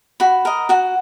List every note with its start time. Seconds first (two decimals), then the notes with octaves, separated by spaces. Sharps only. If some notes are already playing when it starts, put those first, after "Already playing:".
0.20 F#4 B5
0.45 A#4 D#5
0.69 F#4 F#5